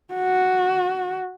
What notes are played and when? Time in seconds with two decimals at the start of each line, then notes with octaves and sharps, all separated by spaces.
0.14 F#4